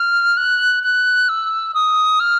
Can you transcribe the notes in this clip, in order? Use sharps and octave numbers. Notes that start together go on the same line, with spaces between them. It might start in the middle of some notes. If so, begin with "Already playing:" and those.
Already playing: F6
F#6
F#6
E6
D#6
F6